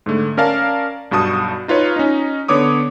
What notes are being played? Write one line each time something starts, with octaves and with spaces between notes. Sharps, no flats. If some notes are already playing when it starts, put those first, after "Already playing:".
G#2 D3 A3
C#4 A#4 D5 F5 A5
B1 G2 F#4 A5 D#6
D#4 F4 B4 C#5 F5
C#4 D#4
D3 B3 C#5 D6 D#6